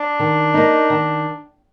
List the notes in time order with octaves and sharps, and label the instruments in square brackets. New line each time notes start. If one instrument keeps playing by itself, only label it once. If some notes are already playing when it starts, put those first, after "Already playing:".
Already playing: [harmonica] D4
[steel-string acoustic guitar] D#3
A#3 D#4
D#3